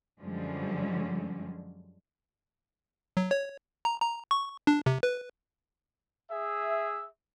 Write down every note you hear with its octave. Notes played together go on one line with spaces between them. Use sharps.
F#2 D3 F3 G3 G#3 C#4
F#3
C#5
A#5
A#5
C#6
D4
C3
B4
G#4 E5